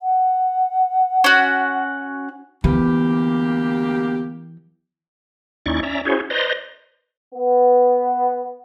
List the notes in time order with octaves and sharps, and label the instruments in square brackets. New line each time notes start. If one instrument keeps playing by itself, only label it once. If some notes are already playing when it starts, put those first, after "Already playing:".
[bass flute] F#5
[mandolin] C#4 F#4
[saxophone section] D2 A#3 G4 [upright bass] E3 [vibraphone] B3
[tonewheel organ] D#2 C#4 D#4 E4 D5 C#6
C#4 D5 E5 A#5
C#4 E4 F#4 G#4 C5 C#5
B4 C5 D5 D#5 A#5 C6
[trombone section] B3